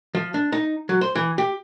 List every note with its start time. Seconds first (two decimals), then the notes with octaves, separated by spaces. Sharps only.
0.15 F3
0.34 D4
0.52 D#4
0.89 F#3
1.01 C5
1.15 E3
1.38 G4